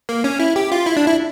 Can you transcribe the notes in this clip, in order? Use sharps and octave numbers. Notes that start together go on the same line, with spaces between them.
A#3
C#4
E4
G4
F4
E4
D4
E4